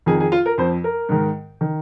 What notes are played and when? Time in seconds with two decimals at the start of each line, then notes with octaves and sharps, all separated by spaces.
0.06 F2 D#3 G#4
0.20 G#4
0.32 F4
0.46 A#4
0.58 F2 F3 C5
0.84 A#4
1.09 G#2 D#3
1.61 D#3